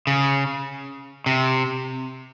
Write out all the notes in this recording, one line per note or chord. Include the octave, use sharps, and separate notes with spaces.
C#3
C3